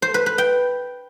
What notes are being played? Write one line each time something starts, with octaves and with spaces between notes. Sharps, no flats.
C5
B4
B4
G5